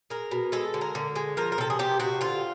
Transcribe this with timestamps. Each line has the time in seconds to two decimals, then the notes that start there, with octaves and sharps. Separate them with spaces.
0.10 G#3 A#4
0.31 B2
0.52 G#3 A4
0.74 D3
0.81 A#4
0.95 D3
1.16 G#3
1.37 F3 A#4
1.52 A#4
1.58 C3 A4
1.70 G#4
1.79 C3 G4
2.00 C3 F#4
2.21 D3 F4